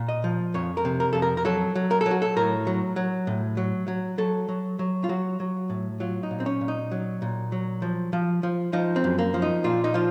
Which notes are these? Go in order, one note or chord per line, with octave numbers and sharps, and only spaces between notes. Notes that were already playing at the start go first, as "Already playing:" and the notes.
Already playing: A#2
D#5
F3
F2 C#5
A#4
C3
A#4
F2 A4
A#4
A#4
F#3 A4
F#3
A#4
A4
F#3
F#4
A4
A2 A#4
F#3
F#3
A2
F#3
F#3
F#3 A4
F#3
F#3
F4
F#3 F#4
F#3
A2
F#3 F4
D#4
A#2
C4
C#4
A#2
D#4
F#3
A#2
F#3
F3
F3
F3
F3 D#4
C4
F#2
A#3
F3
D#4
A#2 F4
D#4
F3 F4